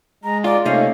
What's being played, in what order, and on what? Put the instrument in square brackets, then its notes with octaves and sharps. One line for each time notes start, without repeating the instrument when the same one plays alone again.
[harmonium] G#3 [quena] A#5
[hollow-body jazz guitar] F4 [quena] D5
[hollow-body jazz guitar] C3 A#3 D#4 [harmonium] A3 C#4 [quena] F5